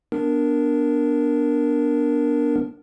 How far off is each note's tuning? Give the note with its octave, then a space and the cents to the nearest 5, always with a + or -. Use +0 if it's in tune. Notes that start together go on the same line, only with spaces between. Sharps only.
B3 +0 D4 +0 A#4 +0